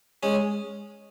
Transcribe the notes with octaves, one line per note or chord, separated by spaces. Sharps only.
G#3 C#4